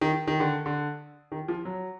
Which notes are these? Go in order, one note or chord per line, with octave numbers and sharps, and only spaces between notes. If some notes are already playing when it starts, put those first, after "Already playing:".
D#3
D#3
D3
D3
D#3
F3
F#3